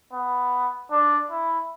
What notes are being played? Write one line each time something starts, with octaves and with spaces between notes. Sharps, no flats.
B3
D4
E4